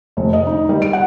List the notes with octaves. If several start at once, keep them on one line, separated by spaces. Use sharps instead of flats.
F1
D#5
D#4
G3
D7
F#5